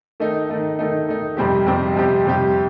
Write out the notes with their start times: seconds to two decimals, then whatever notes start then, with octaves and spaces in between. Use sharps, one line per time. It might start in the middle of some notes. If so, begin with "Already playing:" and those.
0.20 D#3 A3 D#4
0.49 D#3 A3 D#4
0.79 D#3 A3 D#4
1.08 D#3 A3 D#4
1.37 F2 C3 G3 C4 G4
1.66 F2 C3 G3 C4 G4
1.96 F2 C3 G3 C4 G4
2.25 F2 C3 G3 C4 G4